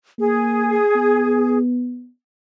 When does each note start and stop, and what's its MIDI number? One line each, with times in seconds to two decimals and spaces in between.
0.19 0.80 58
0.19 1.58 68
0.96 2.09 59